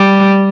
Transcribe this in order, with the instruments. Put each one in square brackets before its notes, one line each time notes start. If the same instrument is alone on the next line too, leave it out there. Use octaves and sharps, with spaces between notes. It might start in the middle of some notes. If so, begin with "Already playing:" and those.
Already playing: [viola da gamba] G3